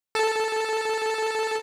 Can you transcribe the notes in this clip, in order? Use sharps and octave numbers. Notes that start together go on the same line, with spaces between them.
A4 A5